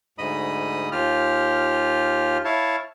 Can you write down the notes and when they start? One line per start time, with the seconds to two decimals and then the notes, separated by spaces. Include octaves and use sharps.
0.18 D2 G#2 D#5 B5 D#6
0.92 D#2 F4 G4 F6
2.45 E4 C#5 F5 A5